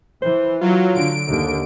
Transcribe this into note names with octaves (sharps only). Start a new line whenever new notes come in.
E3 C5
F#3 F4
D3 D7
D#2 D3 A3